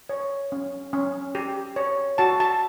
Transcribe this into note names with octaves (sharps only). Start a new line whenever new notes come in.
C#5
C#4
C#4
G4
C#5
F#4 A5
A5